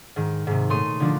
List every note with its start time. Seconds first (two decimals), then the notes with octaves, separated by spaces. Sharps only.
0.16 G#2 D#3
0.47 G#2 C3
0.69 A#2 A3 C#5 C6 D#6 D#7
1.00 D3 F3 D4